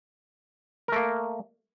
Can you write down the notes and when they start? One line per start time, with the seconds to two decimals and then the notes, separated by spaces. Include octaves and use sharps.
0.88 A#4
0.92 A3
0.96 A#3